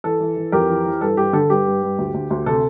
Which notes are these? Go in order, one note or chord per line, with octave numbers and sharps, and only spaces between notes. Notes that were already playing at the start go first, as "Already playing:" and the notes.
E3 A4
E3
E3
F2 G4 A#4
E3
E3
G2 A4
G2 G4
D3 A4
G2 G4
G2
G2
D2
D2
D2
C3 A4